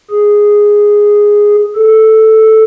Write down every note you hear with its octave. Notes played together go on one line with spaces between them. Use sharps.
G#4
A4